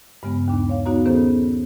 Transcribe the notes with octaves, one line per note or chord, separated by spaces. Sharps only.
G2 C#3 G#3 B3
D#2 D4
C#5 F5
B3 D#4 F#4 C#5 A#5
D#3 B3 C#4 G#4 A4 C5